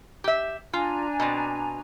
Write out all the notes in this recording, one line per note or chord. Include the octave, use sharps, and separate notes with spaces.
G4 E5
D4 F4 G#5 A#5
B2 C4